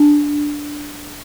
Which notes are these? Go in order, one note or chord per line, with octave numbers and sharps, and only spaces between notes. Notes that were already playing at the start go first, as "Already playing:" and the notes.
Already playing: D4